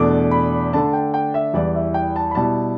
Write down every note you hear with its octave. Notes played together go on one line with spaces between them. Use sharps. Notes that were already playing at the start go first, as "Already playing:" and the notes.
Already playing: E2 B2 A3 D4 D6
B5
D3 A3 D4 A5
G5
G5
E5
E2 E3 G3 E4 D5
E5
G5
A5
B5
B2 G3 E4 A5